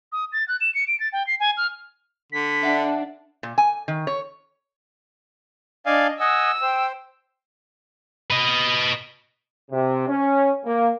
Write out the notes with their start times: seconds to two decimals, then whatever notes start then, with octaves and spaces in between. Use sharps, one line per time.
0.12 D#6
0.32 A6
0.48 F#6
0.61 E7
0.75 C#7
0.87 D7
1.00 A6
1.13 G5
1.27 C7
1.40 G#5
1.57 F6
2.32 D3 B6
2.63 D4 E5 F#5 C7
3.43 A#2
3.58 G#5
3.88 D#3
4.07 C#5
5.86 D4 D5 D#5 F5 G#5
6.20 D#5 F#5 G#5 D#6 E6
6.62 C5 G5
8.30 B4 D#5
9.71 C3
10.08 C#4
10.65 A#3